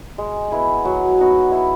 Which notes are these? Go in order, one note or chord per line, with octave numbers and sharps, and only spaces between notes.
G#3
B3 E4 G#4
F#3
B3 D#4 F#4
E4